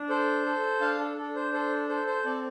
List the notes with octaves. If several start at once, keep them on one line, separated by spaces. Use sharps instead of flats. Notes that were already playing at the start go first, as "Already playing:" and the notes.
Already playing: D4
A4 C5
A4
D4 F5 A5
A4
D4 A4
C5
A4 C5
A4 C5
C5
C4 A4 D5